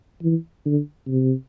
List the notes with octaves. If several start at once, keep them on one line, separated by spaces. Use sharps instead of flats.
E3
D3
C3